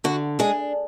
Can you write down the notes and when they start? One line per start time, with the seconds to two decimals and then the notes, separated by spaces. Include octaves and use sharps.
0.04 D3 F#4
0.39 G#3 D4 G#4